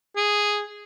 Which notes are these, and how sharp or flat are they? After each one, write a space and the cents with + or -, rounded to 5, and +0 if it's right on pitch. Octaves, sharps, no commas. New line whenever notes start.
G#4 -5